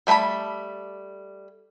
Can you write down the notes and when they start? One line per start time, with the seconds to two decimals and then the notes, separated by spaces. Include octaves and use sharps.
0.07 G3 A3 B4 A5 B5